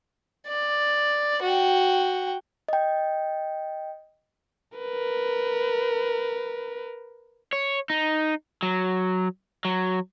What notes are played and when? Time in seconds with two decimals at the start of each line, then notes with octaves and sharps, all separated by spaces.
0.47 D5
1.42 F#4 G5
2.68 D#5 G5
4.78 A#4 B4
7.53 C#5
7.90 D#4
8.63 F#3
9.65 F#3